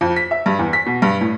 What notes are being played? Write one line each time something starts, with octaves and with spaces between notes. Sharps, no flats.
F2
B6
E5
G2
E2
B6
B2
G2
A2